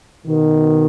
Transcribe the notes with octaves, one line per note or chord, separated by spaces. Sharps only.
B2 D#3